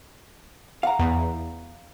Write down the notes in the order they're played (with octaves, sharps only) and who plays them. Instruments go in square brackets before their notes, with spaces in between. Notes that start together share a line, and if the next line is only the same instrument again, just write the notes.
[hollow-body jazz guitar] F5 F#5 A#5
[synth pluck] E2